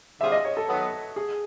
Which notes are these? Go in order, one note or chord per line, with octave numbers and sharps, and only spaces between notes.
D3 G3 C4 F4 G#4 E5
D#5
C#5
A4
D#3 F#3 B3
G#4